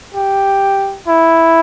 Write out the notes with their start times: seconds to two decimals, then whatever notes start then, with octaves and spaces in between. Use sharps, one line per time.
0.14 G4
1.07 E4